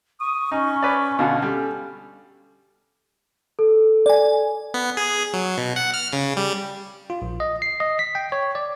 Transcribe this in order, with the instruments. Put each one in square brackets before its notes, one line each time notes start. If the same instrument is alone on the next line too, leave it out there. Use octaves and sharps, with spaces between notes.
[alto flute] C#6 [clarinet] D#6
[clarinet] C#4 [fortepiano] D#4
[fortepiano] B4 C#5 D5
[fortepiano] B2 D3 [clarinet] C#4 [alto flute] F5
[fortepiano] G3 [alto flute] A4
[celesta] A4
[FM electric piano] D5 G#5
[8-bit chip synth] B3
G#4
F#3
B2
F#5
F6
C#3
G3
[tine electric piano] F4
A#1
D#5
C7
D#5
B6
G5
C#5
D5